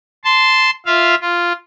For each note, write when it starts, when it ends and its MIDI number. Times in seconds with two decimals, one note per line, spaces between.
0.25 0.70 81
0.25 0.70 84
0.86 1.15 65
0.86 1.15 76
0.86 1.15 77
1.21 1.52 65